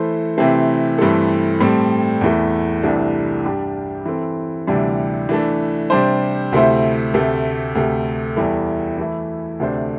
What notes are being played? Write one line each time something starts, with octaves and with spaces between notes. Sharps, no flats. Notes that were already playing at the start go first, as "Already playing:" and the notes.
Already playing: E3 A3 E4 A4 C5
C3 E3 A3 C4
G2 E3 A3 C4 A4
A2 G3 C4 A4
E2 E3 A3
C2 C3 E3 A3 D4
G2 G3 D4 G4
E3 C4 A4
D2 C3 E3 G3 D4
E3 A3 D4
C3 G3 D4 C5
D2 C3 A3 E4 C5
D2 C3 A3
D2 C3 A3
E2 E3 G3 E4 A4
E3 A3 E4
D2 C3 A3 D4 C5